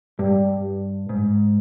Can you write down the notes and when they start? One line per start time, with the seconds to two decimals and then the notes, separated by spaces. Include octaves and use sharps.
0.19 G2 G3
1.09 G#2